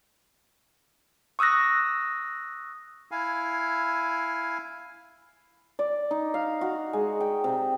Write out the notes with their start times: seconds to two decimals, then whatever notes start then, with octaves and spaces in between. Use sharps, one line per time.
1.39 C#6 D#6 E6 F#6 A#6
3.11 E4 F5 G#5
5.79 D5
6.11 D#4
6.34 F5
6.61 F#4
6.93 G#3
7.20 G5
7.44 C3